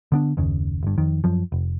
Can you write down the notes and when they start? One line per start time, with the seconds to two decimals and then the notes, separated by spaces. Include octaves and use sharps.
0.12 D3 B3 D4
0.37 F#1 D#2 C#3
0.83 G1 G2
0.98 F2 D#3
1.24 F#2 F3
1.52 F1